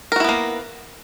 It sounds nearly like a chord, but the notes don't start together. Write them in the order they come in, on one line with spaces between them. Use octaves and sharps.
A#4 F#4 E4 B3 A#3